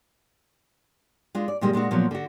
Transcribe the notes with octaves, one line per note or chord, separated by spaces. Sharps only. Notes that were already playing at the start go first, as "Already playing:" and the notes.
G#3 D4 F4
D5
A#2 D3 G3 G#3
A#2 G#3 D4 F#4
A#2 F3 F#3 B3
D3 F#4